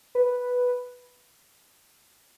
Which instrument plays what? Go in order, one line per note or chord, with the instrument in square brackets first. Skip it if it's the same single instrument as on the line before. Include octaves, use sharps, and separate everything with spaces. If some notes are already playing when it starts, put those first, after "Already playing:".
[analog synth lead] B4